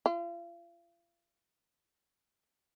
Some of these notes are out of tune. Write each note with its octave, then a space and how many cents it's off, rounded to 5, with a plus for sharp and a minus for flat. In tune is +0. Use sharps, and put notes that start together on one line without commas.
F4 -40